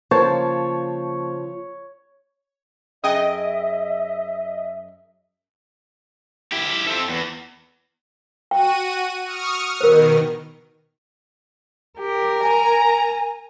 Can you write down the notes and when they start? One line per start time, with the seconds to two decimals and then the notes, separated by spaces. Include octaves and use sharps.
0.11 C#3 F3 A#3 C5 C#5 A5
3.04 F#2 G#4 D#5 E5 G5
6.52 E4 G4
6.87 C4 A4
7.09 E2
8.51 F#4 G5 D#7
9.25 C#6 D#6 F6
9.81 B2 D#3 A#4 C5
11.99 G4 A#4
12.43 G#5 A#5